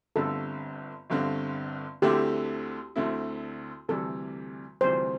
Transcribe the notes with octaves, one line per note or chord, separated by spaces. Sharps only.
G1 G2 D3 C4 A4
G1 G2 D3 C4
D2 D3 A3 C4 E4 G4
D2 D3 A3 C4 E4
D2 C3 E3 G3 A4
D2 C3 E3 G3 C5